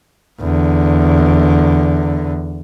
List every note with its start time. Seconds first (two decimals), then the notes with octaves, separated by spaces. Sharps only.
0.40 E2 D3